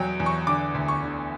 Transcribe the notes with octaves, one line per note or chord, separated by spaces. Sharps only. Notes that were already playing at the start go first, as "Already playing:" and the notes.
Already playing: E2 F#3 G5
E2
C#6
D3 D6
D2
C#6
D3